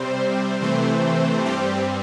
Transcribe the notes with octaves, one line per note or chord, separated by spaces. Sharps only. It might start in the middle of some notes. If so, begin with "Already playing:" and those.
Already playing: C3 G3 C4 C5
C3 E3 A3 C4
G2 G3 C4 G4